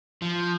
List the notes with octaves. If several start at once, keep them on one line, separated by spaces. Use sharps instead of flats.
F3